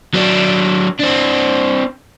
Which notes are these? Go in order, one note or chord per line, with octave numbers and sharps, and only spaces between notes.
F#3 D4
C4 D4